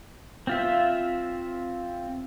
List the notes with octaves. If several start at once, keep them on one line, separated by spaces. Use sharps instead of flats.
C4 F4 E5